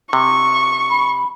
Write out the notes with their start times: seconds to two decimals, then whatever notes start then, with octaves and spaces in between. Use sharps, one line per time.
0.13 C3 C#6
0.90 B5